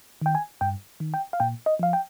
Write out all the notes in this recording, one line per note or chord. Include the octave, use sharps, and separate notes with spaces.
D#3 G5
G#5
G2 G5
D#3
G5
F5
A#2 G5
D#5
F3 F5
G5